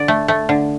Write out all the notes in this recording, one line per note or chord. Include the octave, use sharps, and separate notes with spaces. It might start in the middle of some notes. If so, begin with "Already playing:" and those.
Already playing: D3 D5
A3
A3
D3